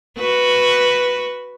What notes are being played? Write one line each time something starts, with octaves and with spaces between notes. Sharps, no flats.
F#4 B4